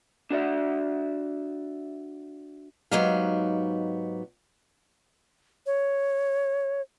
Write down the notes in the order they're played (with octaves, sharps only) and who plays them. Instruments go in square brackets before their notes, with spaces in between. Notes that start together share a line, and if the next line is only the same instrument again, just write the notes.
[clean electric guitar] D4 F#4 D5 E5
[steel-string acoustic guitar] G#2 F#3 B3 D#4 G4 F5
[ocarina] C#5